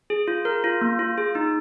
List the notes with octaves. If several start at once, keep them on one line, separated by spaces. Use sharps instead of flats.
G#4
F4
A#4
F4
A#3
F4
G#4
D#4